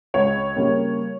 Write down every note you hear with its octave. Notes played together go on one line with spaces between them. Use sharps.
C#2 C#5
C#3 G3 A#3